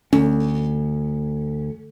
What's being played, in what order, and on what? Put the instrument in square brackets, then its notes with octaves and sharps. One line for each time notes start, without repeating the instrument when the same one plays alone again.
[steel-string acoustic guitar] D2 [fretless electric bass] C#4